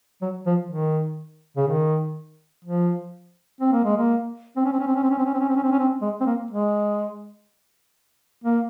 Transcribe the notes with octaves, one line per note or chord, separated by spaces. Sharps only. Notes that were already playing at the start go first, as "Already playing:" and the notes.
F#3
F3
D#3
C#3
D#3
F3
C4
A#3
G#3
A#3
C4
C#4
C4
C#4
C4
C#4
C4
C#4
C4
C#4
C4
C#4
C4
C#4
C4
C#4
C4
G#3
C4
A#3
G#3
A#3